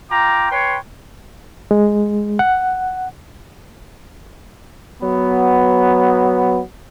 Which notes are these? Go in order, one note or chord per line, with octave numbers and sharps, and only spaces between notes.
F4 G5 A#5 D6
B4 C#5 G5 C6
G#3
F#5
F#3 B3